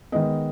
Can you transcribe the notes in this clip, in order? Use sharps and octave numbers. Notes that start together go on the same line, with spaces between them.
D#3 G#3 B3 D#5